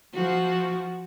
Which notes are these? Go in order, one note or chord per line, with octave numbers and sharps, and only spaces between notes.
F3 F#4